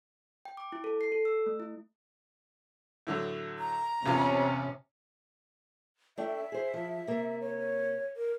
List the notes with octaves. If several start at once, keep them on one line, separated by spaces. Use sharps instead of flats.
G5
D6
E4
A4
C7
A4
E6
A3
E4
A2 D3 F#3
A#5
A1 E2 C3 C#4 F4
A3 D4 E5 G5
G#4 C5
F3
C3 A#3
C#5
A#4